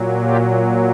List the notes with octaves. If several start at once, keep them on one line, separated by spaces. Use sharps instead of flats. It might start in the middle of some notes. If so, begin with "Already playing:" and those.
Already playing: A#2 F#3
F4 G4